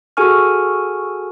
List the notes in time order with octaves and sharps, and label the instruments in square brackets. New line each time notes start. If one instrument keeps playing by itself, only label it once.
[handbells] F#4 G#4 A4 G#5 C#6 F6